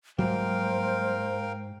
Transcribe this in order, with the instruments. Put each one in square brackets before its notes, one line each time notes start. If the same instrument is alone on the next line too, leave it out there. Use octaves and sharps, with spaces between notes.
[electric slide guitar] G#2 [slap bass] F#3 G3 A#3 [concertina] A#4 F5 G5 [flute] C5